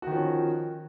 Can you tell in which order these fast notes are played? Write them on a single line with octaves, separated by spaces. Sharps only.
F#4 D#3 F3 C#4